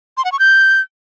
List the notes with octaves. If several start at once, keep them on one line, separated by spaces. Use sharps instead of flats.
C6
F#5
C#6
G6